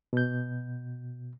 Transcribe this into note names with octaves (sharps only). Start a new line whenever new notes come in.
B2 G6